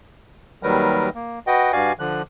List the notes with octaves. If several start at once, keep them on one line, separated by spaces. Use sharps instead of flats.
D#2 D#3 F#3 G3 A#4 B4
A#3
F#4 B4 D#5 F#5 G5
G2 F#4 D5 F5 G#5
D3 F3 F#6